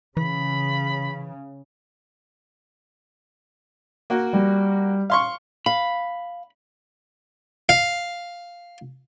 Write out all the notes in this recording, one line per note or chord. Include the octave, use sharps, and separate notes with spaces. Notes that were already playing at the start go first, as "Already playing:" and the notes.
C#3 E3 B5
A#3 F#4
G3
F5 C6 C#6
F5 B5
F5